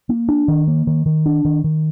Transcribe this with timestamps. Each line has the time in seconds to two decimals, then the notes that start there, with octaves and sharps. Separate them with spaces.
0.09 A#3
0.29 D4
0.48 D#3
0.68 A#3
0.87 D#3
1.06 D#3
1.26 D4
1.45 D#3
1.64 D#3